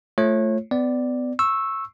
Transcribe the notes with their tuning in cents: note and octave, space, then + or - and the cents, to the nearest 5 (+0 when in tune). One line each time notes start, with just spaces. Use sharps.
A3 +0 F4 -15 C#5 -30
B3 +35 D5 +0
C#6 -20 E6 +0